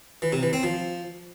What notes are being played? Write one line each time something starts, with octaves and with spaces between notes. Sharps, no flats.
E3
C3
E3
C4
F3